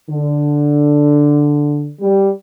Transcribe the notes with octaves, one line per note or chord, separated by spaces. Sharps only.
D3
G3